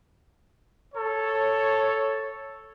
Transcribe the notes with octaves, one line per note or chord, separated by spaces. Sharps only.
A4 C#5